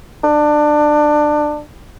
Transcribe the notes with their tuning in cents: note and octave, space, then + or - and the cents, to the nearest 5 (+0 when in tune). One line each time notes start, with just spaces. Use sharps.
D4 +20